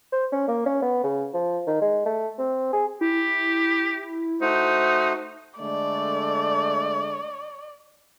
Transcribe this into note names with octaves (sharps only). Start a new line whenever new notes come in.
C5
C#4
A#3
C#4
B3
C#3
F3
D#3
G#3
A3
C4
G#4
E4 G4
A3 D#4 F#4 C5
D3 G#3 A3 D5